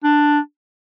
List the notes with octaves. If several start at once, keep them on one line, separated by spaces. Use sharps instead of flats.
D4